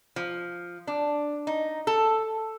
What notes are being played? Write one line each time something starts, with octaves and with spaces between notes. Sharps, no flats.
F3
D4
D#4
A4